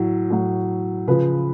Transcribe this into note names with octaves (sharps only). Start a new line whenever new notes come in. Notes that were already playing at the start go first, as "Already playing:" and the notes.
Already playing: A2 F#3
A2 F#3
C#3 F3 B4